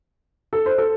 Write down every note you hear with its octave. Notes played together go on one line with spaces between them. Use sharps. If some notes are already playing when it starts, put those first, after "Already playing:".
A4
C5
A4